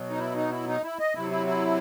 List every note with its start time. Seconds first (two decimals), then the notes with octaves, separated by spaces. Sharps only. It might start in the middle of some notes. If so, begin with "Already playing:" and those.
Already playing: B2 F#3
0.10 D#4
0.19 E4
0.36 D#4
0.51 E4
0.68 D#4
0.84 E4
0.99 D#5
1.15 C3 F#3 E4
1.31 E4
1.47 E4